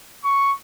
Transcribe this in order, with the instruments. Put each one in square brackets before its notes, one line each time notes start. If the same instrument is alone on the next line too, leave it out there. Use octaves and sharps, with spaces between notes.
[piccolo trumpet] C#6